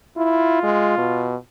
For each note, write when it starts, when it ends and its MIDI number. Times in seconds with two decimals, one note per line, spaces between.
0.17 0.59 64
0.17 1.41 65
0.63 0.95 56
0.98 1.36 47